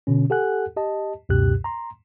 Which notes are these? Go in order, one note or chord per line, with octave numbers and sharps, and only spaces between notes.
B2 D3 C#4
G4 A4 F#5 G#5 F#6
G4 D#5 A5
C#2 F#2 B2 G4 F#6
A#5 C6